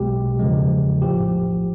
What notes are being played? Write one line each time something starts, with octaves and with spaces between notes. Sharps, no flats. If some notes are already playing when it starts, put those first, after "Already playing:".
Already playing: B1 B2 G#3 G4
E2 C#3 F3 G#3
A#1 A2 F3 G4